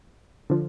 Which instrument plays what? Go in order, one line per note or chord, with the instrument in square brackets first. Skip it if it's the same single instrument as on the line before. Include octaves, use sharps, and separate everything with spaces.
[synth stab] D3 F3